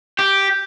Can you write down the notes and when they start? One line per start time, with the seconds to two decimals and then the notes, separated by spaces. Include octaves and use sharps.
0.19 G4